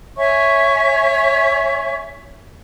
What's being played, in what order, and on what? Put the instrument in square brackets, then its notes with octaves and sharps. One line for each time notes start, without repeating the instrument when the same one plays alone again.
[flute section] C#5 E5 G#5 C#6